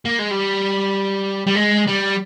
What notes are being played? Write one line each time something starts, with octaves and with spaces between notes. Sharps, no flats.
A#3
G#3
G3
G3
G#3
G3